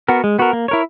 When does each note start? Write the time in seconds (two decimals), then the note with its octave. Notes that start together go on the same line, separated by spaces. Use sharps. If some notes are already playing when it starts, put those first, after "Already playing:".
0.08 B3 F#4 A#4
0.24 G#3
0.39 B3 F#4 A#4
0.53 A#3
0.68 E4 A#4 C#5